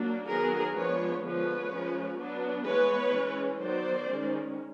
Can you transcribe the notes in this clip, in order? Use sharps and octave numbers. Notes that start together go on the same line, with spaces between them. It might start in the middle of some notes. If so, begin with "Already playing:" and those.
Already playing: F#3 A#3 D4
D#3 F#3 B3 G#4 A#4
F3 G#3 B3 D4 B4 C#5
D3 F3 G#3 B3 B4 C#5
F3 G#3 C#4
F#3 B3 D4
E3 G#3 B3 B4 C#5
E3 G#3 C#4
D#3 F#3 B3 C5 D5
D#3 G#3 C#4